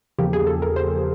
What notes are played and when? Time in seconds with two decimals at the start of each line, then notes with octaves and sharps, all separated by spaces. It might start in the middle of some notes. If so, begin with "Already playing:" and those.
0.18 E2 C#3 F3 A#3 G4
0.33 G#4
0.47 A4
0.62 A#4
0.76 C5